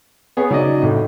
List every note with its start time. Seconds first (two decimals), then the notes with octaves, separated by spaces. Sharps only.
0.37 B3 G#4 C#5
0.51 C#3 F#3 D#4 D5 D#5
0.82 A1 A2